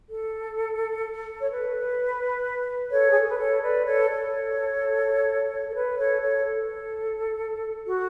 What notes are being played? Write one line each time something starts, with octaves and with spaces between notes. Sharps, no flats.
A4
C#5
B4
A4 C#5
G#4
A4
B4
A4 C#5
B4 D5
A4 C#5
A4 C#5
A4
B4
A4 C#5
A4 C#5
A4
F#4